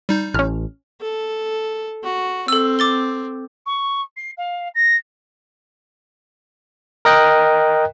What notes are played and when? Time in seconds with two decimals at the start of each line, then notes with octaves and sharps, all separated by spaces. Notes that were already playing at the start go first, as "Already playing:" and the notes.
0.09 G3 D#4 G6
0.34 A1 C#4 F6
1.01 A4
2.04 F#4
2.48 C4 A4 E6
2.79 D6 A6 G7
3.66 C#6
4.17 C7
4.38 F5
4.75 A#6
7.05 A#4 D#5 G5 F#6